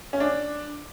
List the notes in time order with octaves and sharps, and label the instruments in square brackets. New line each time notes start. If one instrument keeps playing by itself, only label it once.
[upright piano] C#4
D4